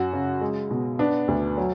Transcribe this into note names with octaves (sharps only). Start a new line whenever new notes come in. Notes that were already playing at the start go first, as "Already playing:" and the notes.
Already playing: F#2 F#4
C#3
G#3
B2
B3 D4
D2
F#3